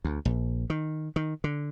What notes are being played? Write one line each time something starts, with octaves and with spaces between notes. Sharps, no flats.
D2
A#1
D#3
D#3
D3